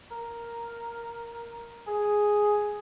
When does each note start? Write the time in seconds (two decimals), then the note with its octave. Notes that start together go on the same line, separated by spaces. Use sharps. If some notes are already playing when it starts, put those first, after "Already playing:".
0.11 A#4
1.87 G#4